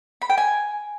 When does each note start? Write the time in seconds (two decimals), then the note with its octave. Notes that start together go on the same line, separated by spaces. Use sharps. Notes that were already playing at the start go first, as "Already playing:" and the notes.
0.22 B5
0.30 G5
0.38 G#5